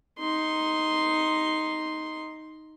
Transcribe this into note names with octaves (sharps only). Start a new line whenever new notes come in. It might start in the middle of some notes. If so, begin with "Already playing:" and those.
D#4 C6